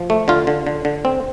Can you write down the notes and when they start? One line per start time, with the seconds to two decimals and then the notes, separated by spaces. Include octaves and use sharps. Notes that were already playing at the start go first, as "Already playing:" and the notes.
Already playing: F3
0.10 A3
0.28 D3 F4
0.47 D3
0.67 D3
0.85 D3
1.05 C4